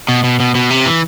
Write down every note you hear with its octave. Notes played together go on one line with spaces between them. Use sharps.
B2
B2
B2
B2
C3
E3